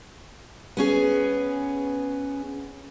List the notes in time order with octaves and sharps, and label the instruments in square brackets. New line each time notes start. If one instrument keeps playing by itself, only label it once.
[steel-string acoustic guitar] B3 C#4 G#4